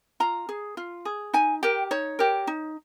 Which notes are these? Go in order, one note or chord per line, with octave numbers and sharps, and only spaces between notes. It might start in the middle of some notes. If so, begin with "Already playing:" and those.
F4 A#5
G#4
F4
G#4
D#4 G#5
G4 A#4 G5
D#4 C#5
G4 A#4
D#4